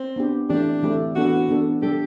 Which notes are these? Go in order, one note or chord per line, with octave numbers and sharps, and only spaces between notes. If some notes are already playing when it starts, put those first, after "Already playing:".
Already playing: C4
B3 D4 G4
E3 A3 C4 D4 G4
E3 A3 C4 G4
E3 B3 D4 F#4 A4
E3 B3 D4 A4
G3 D4 G4 A4